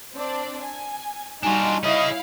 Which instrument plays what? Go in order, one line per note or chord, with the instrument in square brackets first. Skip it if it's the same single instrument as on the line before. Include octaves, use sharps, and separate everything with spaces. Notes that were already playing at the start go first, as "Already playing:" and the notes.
[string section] C4 D4 D5
G#5
[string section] G3 D#4 F#4 [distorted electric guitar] D4 F4 [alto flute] G#5
[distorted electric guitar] C#4 G#4 [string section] E4 F5 [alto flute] D#5